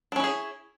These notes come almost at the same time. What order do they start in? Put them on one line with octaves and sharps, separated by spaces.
D4 C#4 E4 G#4